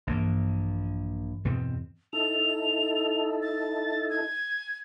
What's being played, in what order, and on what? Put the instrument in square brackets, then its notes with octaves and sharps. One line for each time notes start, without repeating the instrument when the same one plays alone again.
[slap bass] A#1 A#3 [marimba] G2 E3
[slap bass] E2 B2 C4
[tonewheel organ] D#4 E4 A4 [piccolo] F7
[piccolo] A6
G#6